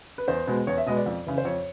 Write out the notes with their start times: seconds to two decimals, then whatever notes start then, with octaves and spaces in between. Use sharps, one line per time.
0.18 B4
0.28 E2 C5
0.47 B2 G#3 B3
0.67 E2 C#5
0.77 E5
0.86 B2 G#3 B3 D#5
0.96 D5
1.06 F2
1.27 C#3 E3
1.38 C5
1.45 F2 C#5